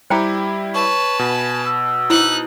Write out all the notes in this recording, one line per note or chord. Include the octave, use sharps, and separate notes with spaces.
G3 E4 G4 C5 G5 A#5
B4 C#5 A5
B2 G#5
E6
D#4 E4 C5 F#6